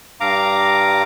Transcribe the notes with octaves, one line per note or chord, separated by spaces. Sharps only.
G2 F5 A#5 D6